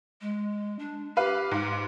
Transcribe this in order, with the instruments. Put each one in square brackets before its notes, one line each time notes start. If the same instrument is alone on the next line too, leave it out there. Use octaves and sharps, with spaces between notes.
[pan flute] G#3
D4
[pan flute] G4 [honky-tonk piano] B4 F5
[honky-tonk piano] G#2